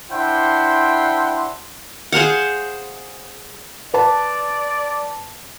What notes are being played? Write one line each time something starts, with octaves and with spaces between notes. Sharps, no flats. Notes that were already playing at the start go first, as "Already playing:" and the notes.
D4 E4 C5 F#5 G5 C6
G#4 C5 F5 F#5
B4 D5 A5